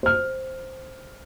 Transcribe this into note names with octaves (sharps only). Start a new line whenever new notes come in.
C5 F6